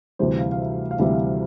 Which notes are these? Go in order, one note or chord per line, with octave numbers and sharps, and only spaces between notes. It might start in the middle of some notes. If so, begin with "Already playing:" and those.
D2 C3 E3 G3 C5
F5
F5
E5
F5
D2 C3 E3 G3 E5
F5